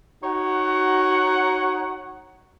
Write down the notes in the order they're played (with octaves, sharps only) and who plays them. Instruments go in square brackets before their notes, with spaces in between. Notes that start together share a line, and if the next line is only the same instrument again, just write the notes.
[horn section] D#4 F#4 C#5 F#5